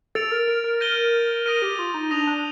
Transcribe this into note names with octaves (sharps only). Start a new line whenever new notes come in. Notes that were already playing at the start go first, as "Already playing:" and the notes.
A4 A6 D7 F7
A#4
A#4
A#4
G6 A#6 D#7 G7
A#4 D#6 A#6 D#7
G4
F4
D#4
D4 D#6 A#6 F7
D4